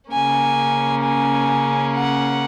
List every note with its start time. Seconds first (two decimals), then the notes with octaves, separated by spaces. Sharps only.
0.11 C#3 A#3 C#4 G#5
1.03 G#5
1.95 F#5